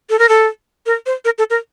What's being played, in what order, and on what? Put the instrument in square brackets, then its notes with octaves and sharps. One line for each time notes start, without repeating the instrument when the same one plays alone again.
[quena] A4
A#4
A4
A#4
C5
A#4
A4
A#4